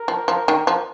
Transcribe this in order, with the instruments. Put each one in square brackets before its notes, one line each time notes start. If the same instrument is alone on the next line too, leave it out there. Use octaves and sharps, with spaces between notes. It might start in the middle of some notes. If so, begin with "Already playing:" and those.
Already playing: [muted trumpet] A#4
[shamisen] F3
F3
D#3
F3